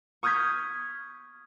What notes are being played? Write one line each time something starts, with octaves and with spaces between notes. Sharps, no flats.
C#6 D#6 F6 G6 G#6 B6